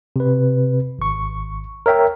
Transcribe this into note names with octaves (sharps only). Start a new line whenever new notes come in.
C3 B4
G#1 C#6
A#4 C#5 E5 G5